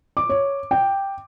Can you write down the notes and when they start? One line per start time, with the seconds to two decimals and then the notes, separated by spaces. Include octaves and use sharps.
0.17 D6
0.29 C#5
0.71 G5